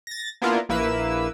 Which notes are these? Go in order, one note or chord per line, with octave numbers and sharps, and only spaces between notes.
A6 A#6
A#3 B3 D4 E4 F4 A#4
A#1 A#3 E4 B4 E6